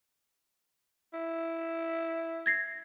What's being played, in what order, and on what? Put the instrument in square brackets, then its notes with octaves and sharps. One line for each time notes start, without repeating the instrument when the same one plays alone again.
[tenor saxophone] E4
[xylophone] G#6 A#6 C7